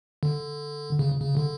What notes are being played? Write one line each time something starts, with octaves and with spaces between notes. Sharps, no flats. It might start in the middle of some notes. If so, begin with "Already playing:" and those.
D3
C#3
C#3
D3